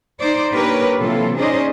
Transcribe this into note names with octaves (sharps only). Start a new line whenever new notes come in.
D#4 C5 D5
A#3 D4 G4 A#4 B4 C#5
C3 E3 F#3 A#3 F4 A4
C#4 D#4 G#4 C5 D5 D#5